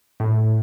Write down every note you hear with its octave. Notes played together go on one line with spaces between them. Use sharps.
A2